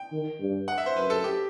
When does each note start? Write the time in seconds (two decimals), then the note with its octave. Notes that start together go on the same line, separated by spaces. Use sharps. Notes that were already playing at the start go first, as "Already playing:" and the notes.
Already playing: G5
0.12 D#3
0.40 G2
0.68 F#5
0.78 E5
0.86 C5
0.96 F#2 B4
1.10 A4
1.24 G4